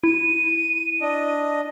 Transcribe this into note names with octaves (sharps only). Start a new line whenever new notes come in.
E4 D#7
D4 D#5